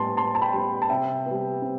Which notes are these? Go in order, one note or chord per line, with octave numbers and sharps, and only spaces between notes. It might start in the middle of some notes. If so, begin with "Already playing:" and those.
Already playing: A2 G3 B3 A5 C6
A2 A5 C6
A5
G5 B5
G3 B3
A5
C3 E5 G5
G3 B3
C3